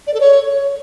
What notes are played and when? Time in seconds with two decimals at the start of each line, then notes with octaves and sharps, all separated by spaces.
0.06 D5
0.13 A4
0.20 C#5